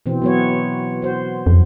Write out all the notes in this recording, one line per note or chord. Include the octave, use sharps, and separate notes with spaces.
B2 E3 C4
F#3 B3 C#5
F#4 C5
F2